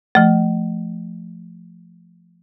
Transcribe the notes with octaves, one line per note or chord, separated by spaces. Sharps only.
F3 A3